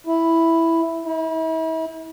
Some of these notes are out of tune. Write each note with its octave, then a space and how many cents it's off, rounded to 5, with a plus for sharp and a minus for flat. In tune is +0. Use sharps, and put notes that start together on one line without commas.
E4 +0
E4 -40